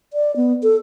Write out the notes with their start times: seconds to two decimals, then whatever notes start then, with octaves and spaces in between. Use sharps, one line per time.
0.13 D5
0.36 B3
0.63 A4